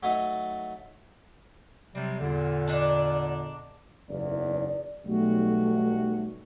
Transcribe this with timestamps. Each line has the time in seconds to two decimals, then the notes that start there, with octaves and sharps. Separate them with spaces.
0.03 F#3 A3 D#4
1.95 C3 F#3 G3 C4
2.20 E2 A#2 D3
2.68 D4 D#4
4.09 F#1 B1 E2 D5
5.06 B1 G3 A3 F#4